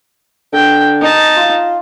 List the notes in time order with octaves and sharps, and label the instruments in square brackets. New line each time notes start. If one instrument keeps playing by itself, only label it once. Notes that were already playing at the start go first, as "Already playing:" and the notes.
[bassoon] D3 [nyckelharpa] G5
[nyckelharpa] D#4 A5
[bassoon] F4